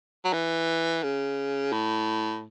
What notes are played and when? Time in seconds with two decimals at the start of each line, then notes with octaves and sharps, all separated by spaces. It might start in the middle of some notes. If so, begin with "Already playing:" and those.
0.25 F#3
0.33 E3
1.03 C#3
1.72 A2